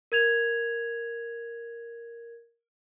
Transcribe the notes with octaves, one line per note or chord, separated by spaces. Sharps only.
A#4 G#6 F7